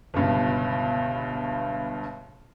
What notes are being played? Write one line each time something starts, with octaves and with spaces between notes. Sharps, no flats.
G1 C#2 G2 B2